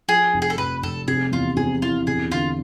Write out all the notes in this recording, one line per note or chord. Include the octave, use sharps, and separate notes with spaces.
F3 G#4
F1
G#4
A4
F1 B4
F1 A4
C3 G#4
E2 F4
C3 G#4
E3 F4
E1 G#4
D3 F4